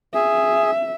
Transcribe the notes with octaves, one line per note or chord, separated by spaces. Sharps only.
G#4 E5